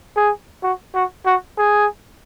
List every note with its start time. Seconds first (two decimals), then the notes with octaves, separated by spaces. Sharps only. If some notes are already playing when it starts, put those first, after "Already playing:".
0.16 G#4
0.63 F#4
0.95 F#4
1.26 F#4
1.58 G#4